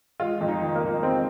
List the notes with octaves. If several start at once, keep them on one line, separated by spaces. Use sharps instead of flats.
G#3 F4
F2
D#4
D#3
A#3
F2
G#3 C4